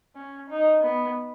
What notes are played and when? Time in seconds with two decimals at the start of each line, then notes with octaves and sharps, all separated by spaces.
0.16 C#4
0.50 D#4
0.83 B3